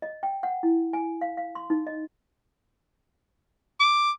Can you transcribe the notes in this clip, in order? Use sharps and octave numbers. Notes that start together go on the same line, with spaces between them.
D#5
G5
F#5
E4
G#5
F5
F5
C6
D#4
D#5
D6